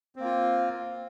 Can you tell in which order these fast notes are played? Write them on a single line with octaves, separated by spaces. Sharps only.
C4 A#3 F4